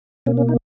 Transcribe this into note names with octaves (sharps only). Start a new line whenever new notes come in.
B2 A#3 C#4
C#4
D#4